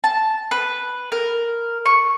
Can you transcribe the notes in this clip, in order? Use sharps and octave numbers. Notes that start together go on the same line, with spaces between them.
A5
B4
A#4
C#6